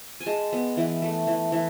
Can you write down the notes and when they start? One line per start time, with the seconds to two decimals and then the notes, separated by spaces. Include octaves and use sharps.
0.20 G#5
0.26 G#3 A5
0.53 B3
0.77 E3
1.02 A3
1.27 E3
1.52 E3